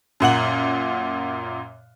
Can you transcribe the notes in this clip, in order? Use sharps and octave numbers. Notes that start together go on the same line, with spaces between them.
F#2 A#2 F#5 F#7